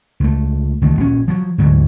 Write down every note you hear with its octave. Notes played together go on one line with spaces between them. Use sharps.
C#2 A3
C#2 D#3 A3
A#1 C#4
F3 F#3
D2 G#2 D3 F#3